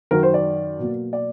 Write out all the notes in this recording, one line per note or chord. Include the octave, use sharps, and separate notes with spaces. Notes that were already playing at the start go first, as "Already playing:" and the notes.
F#2 D#3 F#3 A#4
C5
D5
B2 F#3 A#3
D5